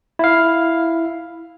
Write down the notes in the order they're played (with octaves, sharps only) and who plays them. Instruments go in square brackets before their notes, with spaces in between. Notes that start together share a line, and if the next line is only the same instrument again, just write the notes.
[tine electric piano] E4 F5